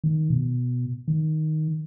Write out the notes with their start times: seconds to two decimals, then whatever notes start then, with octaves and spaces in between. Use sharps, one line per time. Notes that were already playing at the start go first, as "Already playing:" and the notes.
0.04 D#3
0.30 B2
1.08 D#3